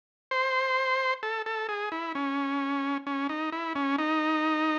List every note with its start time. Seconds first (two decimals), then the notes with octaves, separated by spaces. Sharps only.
0.31 C5
1.23 A4
1.46 A4
1.69 G#4
1.92 E4
2.15 C#4
3.07 C#4
3.29 D#4
3.52 E4
3.75 C#4
3.99 D#4